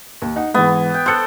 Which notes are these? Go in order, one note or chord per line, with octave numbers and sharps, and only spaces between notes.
D#2
D#4 F#5
G#2 E3 B3
G5
A4 C5 F#6 C#7